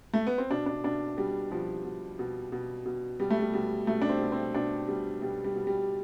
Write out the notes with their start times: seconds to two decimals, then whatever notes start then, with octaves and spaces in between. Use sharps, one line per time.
0.13 A3
0.27 B3
0.38 C4
0.50 B2 D4
0.66 D4
0.84 B2 D4
1.17 B2 G3
1.51 B2 F3
1.84 B2
2.19 B2
2.52 B2
2.85 B2
3.20 B2 G3
3.30 A3
3.41 G3
3.53 B2 G3
3.87 B2 A3
4.02 D4
4.09 C4
4.21 B2
4.32 C4
4.54 B2 D4
4.88 B2 G3
5.22 B2 G3
5.44 G3
5.56 B2
5.67 G3